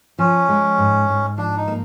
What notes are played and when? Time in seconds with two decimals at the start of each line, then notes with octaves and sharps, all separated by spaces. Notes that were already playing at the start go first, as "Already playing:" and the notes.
0.19 F3 C#4
0.49 G#3
0.78 G#2
1.08 G#2
1.38 F3 D4
1.57 D#4
1.68 A#3